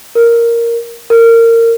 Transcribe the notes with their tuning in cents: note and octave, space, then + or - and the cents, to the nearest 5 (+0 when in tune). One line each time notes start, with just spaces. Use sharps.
A#4 +0
A#4 -25